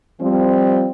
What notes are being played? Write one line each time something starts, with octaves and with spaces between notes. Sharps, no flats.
F3 G3 C4